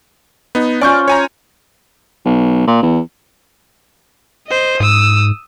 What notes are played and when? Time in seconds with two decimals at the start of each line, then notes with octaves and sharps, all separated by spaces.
0.55 B3 D#4
0.81 C#4 F4 D5 C#6 G6
1.08 C#5 G#5 A#5
2.25 B1
2.67 A#2
2.82 E2
4.47 C5 D#5
4.80 G#2 D#6 E6